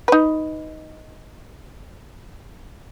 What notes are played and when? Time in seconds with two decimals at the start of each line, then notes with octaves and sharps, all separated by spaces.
0.08 D#4 B4